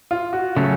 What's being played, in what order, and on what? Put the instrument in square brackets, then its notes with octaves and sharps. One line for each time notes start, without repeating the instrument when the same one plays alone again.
[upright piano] F4
F#4
[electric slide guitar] C#3 F#3 A3 C#4